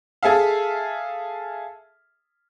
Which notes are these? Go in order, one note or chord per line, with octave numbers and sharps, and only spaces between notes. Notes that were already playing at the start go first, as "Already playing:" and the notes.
G#4 A4 E5 F5